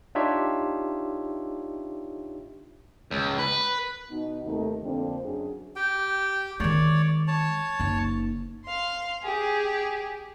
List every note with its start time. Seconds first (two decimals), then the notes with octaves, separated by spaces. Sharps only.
0.15 D4 D#4 F4 G4 C#5 E5
3.11 C#2
3.39 B4
4.11 B2 D#4
4.45 D#2 C3 D#3 A3 D#4
4.83 F2 D3 A#3 C4 D4
5.24 F#2 D4 G#4
5.76 G4 G5
6.60 D#3 G#3 C#5 D5
7.28 C#5 A5
7.80 F#1 D#4
8.65 F5 C6
9.23 G4 G#4